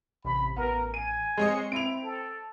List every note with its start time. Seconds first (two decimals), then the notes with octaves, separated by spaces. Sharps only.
0.25 A1 C3 B5
0.56 A1 B3 A#4
0.94 G#5 D#7
1.38 G#3 C4 C#5 D#5 C#7
1.72 C4 E4 D7 F7
2.04 A4